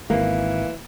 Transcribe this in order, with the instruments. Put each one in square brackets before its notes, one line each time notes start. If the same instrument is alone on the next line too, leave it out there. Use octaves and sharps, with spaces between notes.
[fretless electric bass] G#1 [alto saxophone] E3 [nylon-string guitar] A#3